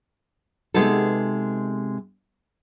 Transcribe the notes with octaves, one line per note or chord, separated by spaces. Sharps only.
C3 G#3 B3 D#4 A4